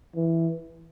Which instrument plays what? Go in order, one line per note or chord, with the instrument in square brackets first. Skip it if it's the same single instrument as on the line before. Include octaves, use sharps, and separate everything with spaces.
[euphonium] E3